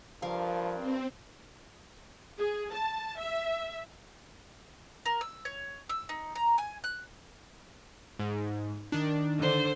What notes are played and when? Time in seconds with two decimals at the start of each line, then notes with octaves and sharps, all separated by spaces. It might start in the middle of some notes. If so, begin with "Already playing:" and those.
0.22 G2 F3 A#4 F5
0.74 C4
2.38 G#4
2.72 A5
3.19 E5
5.06 A#4
5.21 E6
5.45 C#5
5.89 E6
6.09 D#4
6.35 A#5
6.58 G#5
6.84 F#6
8.19 G#2
8.92 D#3 D4
9.39 D3 C5